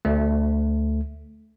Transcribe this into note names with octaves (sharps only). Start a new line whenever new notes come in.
D2 A3